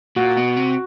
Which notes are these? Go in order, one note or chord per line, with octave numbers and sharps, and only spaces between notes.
A#2 F#4
B2
C3